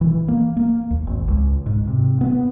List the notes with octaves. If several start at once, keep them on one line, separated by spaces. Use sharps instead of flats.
E3
A#3
A#3
D#2
G#1
C#2
G#2
C3
B3